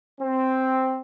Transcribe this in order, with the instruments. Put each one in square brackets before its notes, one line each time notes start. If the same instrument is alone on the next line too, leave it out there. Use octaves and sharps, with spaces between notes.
[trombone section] C4